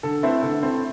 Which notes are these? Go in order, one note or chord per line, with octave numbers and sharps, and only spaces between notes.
D3 A4
A3 C4 E4 B4
D3 A4
A3 C4 E4